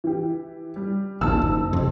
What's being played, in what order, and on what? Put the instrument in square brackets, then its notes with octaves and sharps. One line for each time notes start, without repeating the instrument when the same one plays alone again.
[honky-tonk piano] E3 G4
G3
[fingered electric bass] A#1 D#2 [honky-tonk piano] D#4 A5 E6
[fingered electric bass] F#1
F2 C3